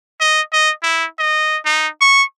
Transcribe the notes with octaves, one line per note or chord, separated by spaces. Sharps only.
D#5
D#5
E4
D#5
D#4
C#6